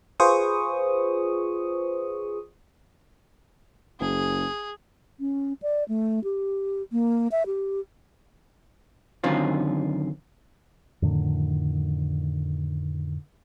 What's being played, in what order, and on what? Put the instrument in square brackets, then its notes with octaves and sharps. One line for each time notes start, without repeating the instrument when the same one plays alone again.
[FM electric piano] F4 G#4 B4 C5 C#6 D#6
[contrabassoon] F#1 [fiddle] G#4
[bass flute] C#4
D5
A3
G4
A#3
E5
G4
[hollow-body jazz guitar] F#2 D3 D#3 C4 C#4 F4
[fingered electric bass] F2 A2 D3 D#3